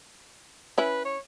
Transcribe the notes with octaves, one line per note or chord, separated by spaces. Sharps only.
C#4 E4 B4
C#5